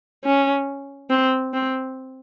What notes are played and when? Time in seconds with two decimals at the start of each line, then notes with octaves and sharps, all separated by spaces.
0.24 C#4
1.10 C4
1.53 C4